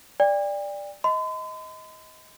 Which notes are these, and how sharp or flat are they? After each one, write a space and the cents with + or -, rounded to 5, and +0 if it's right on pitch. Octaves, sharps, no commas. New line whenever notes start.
D5 +0 G5 +40
D#5 +20 C6 -45